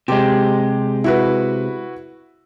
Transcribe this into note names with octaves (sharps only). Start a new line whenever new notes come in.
C3 G#3 G4
E4 F#4 B4